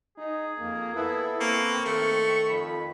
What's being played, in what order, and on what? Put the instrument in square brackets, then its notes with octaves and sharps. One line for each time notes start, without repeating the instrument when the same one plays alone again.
[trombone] D#4 [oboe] G#4
[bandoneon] F2 [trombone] A#3
[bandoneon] B3 A4 B4 [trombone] E4
[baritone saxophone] A#3 [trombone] C4 [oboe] C#6
[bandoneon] D#3 [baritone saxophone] A3
[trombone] F2 [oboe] B5